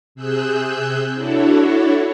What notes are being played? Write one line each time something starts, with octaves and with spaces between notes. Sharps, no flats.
C3 G#4 E6 F#6 G6
D4 E4 F#4 A4 C#5